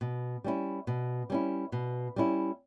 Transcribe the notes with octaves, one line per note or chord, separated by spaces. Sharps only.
B2
G3 C#4 E4
B2
G3 C#4 E4
B2
G3 C#4 E4